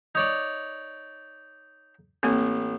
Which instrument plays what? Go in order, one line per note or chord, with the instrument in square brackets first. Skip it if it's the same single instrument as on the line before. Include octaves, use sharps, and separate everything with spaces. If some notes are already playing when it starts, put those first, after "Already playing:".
[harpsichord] D#4 C#5 D5
[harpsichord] A1 [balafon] A#3 C4